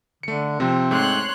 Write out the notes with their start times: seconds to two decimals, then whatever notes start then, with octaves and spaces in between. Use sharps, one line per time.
0.23 D3 A3 C#7
0.60 C3 F3 C4
0.91 G#2 A3 C#5 C6 F#6